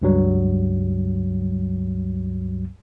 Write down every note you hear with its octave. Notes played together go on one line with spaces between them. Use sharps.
C#2 G2 F#3 G3